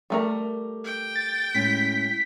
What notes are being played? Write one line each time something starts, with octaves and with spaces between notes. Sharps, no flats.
G3 A3 A#4
G5
A6
A2 G#3 C#4 B6